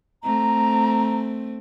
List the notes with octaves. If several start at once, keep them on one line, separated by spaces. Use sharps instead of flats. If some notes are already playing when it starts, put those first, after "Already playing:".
A3 C4 A#5